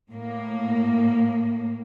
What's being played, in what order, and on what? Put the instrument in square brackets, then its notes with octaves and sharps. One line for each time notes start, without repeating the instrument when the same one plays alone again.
[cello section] A2 A#3